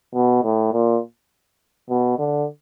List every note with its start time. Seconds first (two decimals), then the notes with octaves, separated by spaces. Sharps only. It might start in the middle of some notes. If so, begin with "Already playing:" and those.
0.14 B2
0.44 A2
0.73 A#2
1.90 B2
2.18 D3